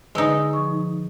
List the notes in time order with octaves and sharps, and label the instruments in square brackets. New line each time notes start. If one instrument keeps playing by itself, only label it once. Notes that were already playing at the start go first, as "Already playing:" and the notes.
[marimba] D3 B4 E6 [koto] G#3 D#4
[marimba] F3 C#6